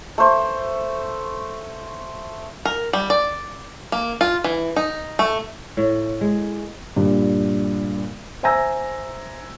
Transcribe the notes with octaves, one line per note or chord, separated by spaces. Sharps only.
A3 C5
A#4
G3
D5
A#3
F4
E3
D#4
A3
A2
G#3
G2 A#2
C5 E5 G#5 A#5 E6 A#6